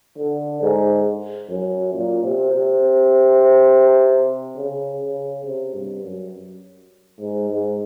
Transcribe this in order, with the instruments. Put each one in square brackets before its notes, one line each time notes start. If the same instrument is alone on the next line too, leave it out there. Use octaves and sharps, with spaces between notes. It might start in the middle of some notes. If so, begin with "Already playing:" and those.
[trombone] D3
G#2
F#2
A#2
C3
C3
C#3
C#3
C3
G2
F#2
G#2
G#2